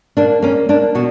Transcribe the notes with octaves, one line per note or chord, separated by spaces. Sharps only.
A#3 D4
A#3 C#4
A#3 D4
B2 F#4